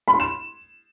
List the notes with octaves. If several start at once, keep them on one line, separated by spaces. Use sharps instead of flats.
B5
C6
E7